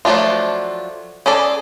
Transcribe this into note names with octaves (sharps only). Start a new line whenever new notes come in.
F3 F#3 A3 D4 F4
C#4 G#4 A4 D5